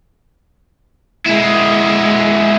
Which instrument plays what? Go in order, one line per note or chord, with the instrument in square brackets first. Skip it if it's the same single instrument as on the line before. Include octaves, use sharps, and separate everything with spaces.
[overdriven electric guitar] G#3 E4